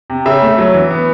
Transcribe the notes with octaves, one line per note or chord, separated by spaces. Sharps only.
C3
C#3 E5 E6
A3
F#3
E3
B3